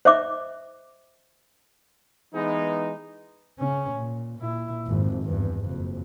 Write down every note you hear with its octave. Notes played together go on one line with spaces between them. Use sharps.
C5 D#5 E5 D6
E3 G#3 B3 D#4
C#3 C#4
A#2
A#2 E4
G#1 F2
E2 G2
F#1 F2